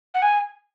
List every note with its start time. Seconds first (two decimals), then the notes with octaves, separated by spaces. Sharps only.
0.14 F#5
0.22 G#5